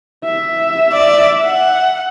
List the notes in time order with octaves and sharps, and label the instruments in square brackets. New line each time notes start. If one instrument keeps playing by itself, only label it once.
[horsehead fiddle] E5
[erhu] D5
F#5